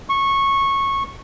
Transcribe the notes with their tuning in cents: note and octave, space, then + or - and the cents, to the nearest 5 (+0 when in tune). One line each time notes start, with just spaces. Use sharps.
C#6 -15